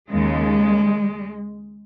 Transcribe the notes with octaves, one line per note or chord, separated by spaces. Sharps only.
D#2 C#3 G#3